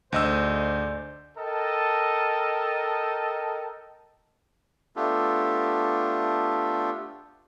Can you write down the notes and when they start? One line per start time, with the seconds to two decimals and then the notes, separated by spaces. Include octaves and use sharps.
0.12 D2 G#2 C5 D5 D#5 E6
1.38 A4 A#4 D#5 G5 A5
4.96 A3 B3 D4 F4 G4 A4